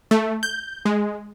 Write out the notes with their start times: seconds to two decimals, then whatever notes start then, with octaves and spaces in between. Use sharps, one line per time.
0.11 A3
0.43 G6
0.86 G#3